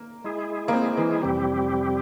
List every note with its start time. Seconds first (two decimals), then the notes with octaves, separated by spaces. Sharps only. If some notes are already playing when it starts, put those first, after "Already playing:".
Already playing: A#3
0.24 G#3 E4 G#4
0.68 A#3
0.73 C4
0.97 E3
1.21 F2 C3 E3 G3 C4 G4